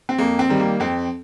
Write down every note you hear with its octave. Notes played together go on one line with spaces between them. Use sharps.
C4
F2 A#3
C4
D#3 G3
A#3
F2 C4